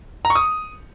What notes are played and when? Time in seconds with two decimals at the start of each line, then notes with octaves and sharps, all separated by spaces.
0.25 A#5
0.30 C#6
0.35 D#6